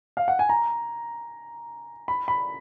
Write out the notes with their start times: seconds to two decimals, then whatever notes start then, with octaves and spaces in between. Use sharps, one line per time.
0.17 F5
0.28 F#5
0.39 G#5
0.49 A#5
2.08 B5
2.28 B5